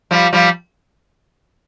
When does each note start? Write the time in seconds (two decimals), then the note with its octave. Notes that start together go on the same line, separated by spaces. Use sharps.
0.11 F3 G3
0.33 F3 G3